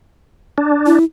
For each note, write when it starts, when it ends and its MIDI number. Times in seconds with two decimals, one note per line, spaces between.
0.58 0.99 62
0.86 1.04 64